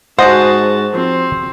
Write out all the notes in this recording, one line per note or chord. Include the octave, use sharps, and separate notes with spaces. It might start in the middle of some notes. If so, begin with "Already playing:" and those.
G#2 F#4 G#4 C5 D#5 F#5 A5
F3 C4